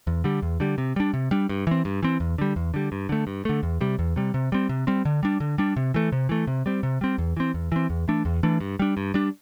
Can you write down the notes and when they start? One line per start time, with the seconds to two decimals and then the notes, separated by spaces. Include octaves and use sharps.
0.07 E2
0.24 D3 G3
0.42 E2
0.60 D3 G3
0.78 C3
0.96 G3 D4
1.14 C3
1.31 G3 D4
1.49 G2
1.67 E3 C4
1.85 G2
2.03 E3 C4
2.20 E2
2.38 D3 G3
2.56 E2
2.74 D3 G3
2.92 G2
3.09 D3 A3
3.27 G2
3.45 D3 A3
3.63 E2
3.81 C3 G3
3.99 E2
4.16 C3 G3
4.34 C3
4.52 G3 C4
4.69 C3
4.87 G3 C4
5.05 D3
5.23 G3 D4
5.40 D3
5.58 G3 D4
5.76 C3
5.94 E3 A3
6.12 C3
6.29 E3 A3
6.47 C3
6.66 G3 C4
6.83 C3
7.01 G3 C4
7.18 E2
7.37 E3 C4
7.54 E2
7.72 E3 C4
7.90 E2
8.08 E3 A3 D4
8.25 E2
8.43 E3 A3 D4
8.60 G2
8.79 G3 D4
8.97 G2
9.14 G3 D4